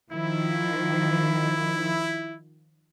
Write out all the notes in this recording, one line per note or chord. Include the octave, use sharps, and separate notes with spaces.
D#3 F3 E4